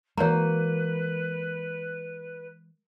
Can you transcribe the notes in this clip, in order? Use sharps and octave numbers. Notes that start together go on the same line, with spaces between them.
E3 G#3 A#3 F#4 B4 C#5 A#5